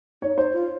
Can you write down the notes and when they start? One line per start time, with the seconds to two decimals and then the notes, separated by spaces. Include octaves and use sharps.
0.22 D#4 C#5
0.37 D#4 C5
0.53 F4